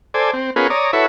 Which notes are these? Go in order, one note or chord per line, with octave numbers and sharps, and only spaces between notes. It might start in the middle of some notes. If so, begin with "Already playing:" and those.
A4 C5 D5 G#5
C4
B3 C#4 F4 G#4 A#4 B4
C#5 D5 A#5 D#6
E4 F#4 A4 B4 C#5 E5